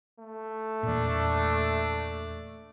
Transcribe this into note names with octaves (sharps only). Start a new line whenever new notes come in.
A3
E2 A#2 D4